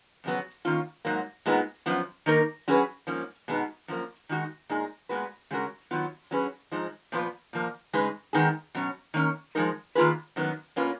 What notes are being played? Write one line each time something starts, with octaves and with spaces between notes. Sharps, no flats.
F2 C#3 F#3 B3
D#3 A#3 C#4 F4
G#2 F#3 A#3
A#2 G#3 B3 D#4
F#2 F3 B3
D#3 A#3 D#4 A#4
F#3 C#4 G#4 B4
G#2 F3 A#3 C#4
B2 G#3 B3 D#4
F#2 F3 A#3
D#3 G#3 D#4 F#4
A#2 G#3 D#4 G#4
A#2 G#3 B3 F#4 B4
C#3 G#3 C#4 F#4 A#4
D#3 F#3 B3 F4
F#3 C#4 G#4 B4
G#2 F3 G#3 D#4
A#2 F3 B3 F4 B4
A#2 F3 A#3
C#3 G#3 D#4 G#4 B4
D#3 G#3 B3 D#4 G#4
B2 F#3 C#4
D#3 A#3 C#4
F3 G#3 D#4 A#4
D#3 A#3 F4 G#4 B4
F#2 D#3 F#3 B3
B2 A#3 C#4 F4 B4